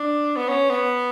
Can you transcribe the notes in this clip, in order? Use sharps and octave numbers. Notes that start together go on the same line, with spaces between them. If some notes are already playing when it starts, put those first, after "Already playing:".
Already playing: D4
B3
C#4
B3